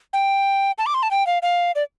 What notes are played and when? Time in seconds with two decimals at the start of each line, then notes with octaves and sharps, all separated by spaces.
0.13 G5
0.78 A5
0.86 D6
0.94 C6
1.03 A5
1.11 G5
1.27 F5
1.42 F5
1.76 D5